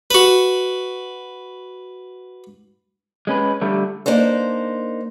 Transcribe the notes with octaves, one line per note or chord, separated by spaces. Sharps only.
F#4 B4
G#3 C#4 B4
D3 G3 A3
A#3 D4 D#4 C5